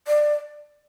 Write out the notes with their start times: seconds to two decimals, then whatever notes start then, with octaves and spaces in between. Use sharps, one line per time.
0.07 D5